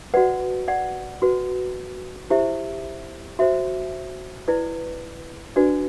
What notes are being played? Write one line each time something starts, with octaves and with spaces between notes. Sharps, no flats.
F#4 B4 D5 F#5
D5 F#5
F#4 B4
E4 G4 C5 E5
F#4 C5 E5
E4 B4 D5
D4 F#4 B4 D5